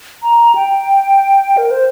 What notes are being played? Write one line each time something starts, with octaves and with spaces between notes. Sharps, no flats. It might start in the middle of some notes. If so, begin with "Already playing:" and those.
A#5
G5
A#4
C5